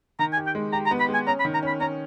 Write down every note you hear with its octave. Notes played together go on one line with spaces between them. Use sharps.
D#3 A#5
G#5
G4
G5
G#3
G4 A#5
A#5
B3
B5
G#3
G#5
C#4 A#5
B5
D#3
A#5
C#4 B5
C#4 A#5